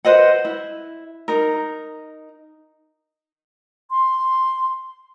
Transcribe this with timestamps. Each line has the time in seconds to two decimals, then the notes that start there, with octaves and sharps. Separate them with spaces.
0.05 B4 C5 D#5 F#5
0.45 E4
1.28 D#4 A#4
3.90 C6